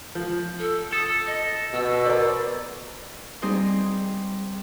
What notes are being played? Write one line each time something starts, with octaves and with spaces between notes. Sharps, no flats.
F3
A4
A4 D#6
D#5
B2 E6
A#4 C5 D5
G3 C4 D#4 G#4 C5